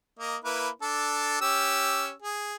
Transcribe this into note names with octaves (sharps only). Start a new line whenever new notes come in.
A#3 D#5
A#3 E4 B4
D4 A4
C#4 G4 E6
G#4